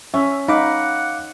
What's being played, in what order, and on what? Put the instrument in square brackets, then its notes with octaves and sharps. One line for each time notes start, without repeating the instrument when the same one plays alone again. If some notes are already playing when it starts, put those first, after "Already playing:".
[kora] C#4 [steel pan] E5
[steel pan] D#4 B5 [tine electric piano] F5 D6 [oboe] F#5